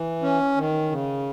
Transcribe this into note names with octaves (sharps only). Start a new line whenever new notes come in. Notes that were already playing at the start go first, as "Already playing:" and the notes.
Already playing: E3
C#4
D#3
C#3